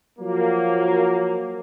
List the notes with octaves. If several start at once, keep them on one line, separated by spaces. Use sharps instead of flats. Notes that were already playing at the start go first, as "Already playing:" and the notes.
F3 F#3 A#3